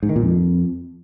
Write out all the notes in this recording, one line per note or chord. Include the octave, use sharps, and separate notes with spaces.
G#2
D#3
A#2
F2